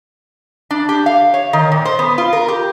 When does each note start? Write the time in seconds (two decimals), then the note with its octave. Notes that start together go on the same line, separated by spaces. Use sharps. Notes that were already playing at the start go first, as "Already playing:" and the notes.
0.71 D4
0.89 G4
1.06 F5
1.34 C#5
1.53 D#3
1.72 A#2
1.85 C5
1.99 B3
2.18 F4
2.33 A#4
2.48 G4